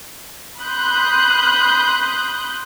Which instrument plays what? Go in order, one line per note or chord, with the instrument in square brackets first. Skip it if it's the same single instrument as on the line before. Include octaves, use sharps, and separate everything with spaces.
[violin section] B5 C6 D#6 F#6 G6